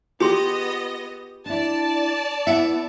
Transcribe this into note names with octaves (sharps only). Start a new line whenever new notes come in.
B3 F4 G4 G#4 D#5 C6 A#6
D4 E4 D5 A5
B3 E4 E5 F#5